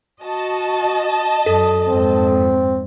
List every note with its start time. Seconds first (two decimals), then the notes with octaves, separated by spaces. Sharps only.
0.23 F#4 D#5 A5
1.46 F#2 A4
1.88 F2 G#2 C4